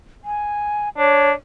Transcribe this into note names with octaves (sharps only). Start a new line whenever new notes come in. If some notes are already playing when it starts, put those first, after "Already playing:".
G#5
D4 C#5